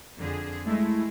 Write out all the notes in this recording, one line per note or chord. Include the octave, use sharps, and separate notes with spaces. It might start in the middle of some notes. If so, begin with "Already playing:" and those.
F2 D3 G#4
G#3 A3 E4